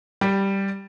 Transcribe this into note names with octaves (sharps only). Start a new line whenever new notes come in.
G3